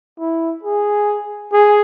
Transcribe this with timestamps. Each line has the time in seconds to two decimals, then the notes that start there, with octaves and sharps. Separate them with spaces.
0.19 E4
0.63 G#4
1.53 G#4